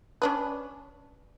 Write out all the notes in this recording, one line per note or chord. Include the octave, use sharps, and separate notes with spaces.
C#4 D4 B4